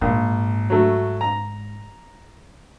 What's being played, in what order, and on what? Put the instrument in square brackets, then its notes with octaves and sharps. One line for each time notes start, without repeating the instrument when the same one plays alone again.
[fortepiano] A#1 [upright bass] G#2
[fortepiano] F#3 A3
A#5